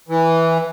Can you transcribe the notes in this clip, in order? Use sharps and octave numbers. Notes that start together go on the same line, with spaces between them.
E3